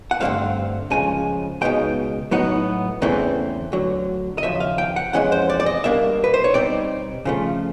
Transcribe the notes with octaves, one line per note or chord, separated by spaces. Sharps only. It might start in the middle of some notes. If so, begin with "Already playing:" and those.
F#5
G2 D3 F3 A3 C4 F5
C#2 C#3 F3 G#3 G#5
C#2 B2 G#3 B3 D#4 G5
A2 F#3 B3 D#4 F#5
E2 C#3 E3 A3 C4
D2 D3 F#3
D#5
D#2 C#3 F3 E5
F5
G5
F#5
F2 C3 E3 G#3 C#4 F#5
C5
D5
D5
D#5
B2 G3 A#3 D4 E5
B4
C5
C#5
B2 G3 C4 D#4 D5
C#3 F3 A3